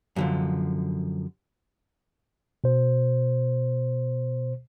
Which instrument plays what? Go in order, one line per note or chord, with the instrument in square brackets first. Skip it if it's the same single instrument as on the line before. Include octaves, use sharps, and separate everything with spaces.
[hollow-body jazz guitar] F#2 D3 F3
[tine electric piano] B2 C5